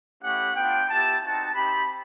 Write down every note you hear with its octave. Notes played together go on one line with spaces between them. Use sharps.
A3 C#4 E4 G4 F#5
B3 D4 F4 G5
B3 E4 G4 A5
C4 D#4 F#4 A5
C4 D#4 G4 B5